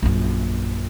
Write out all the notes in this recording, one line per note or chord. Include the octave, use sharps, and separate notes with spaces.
A#1 F#2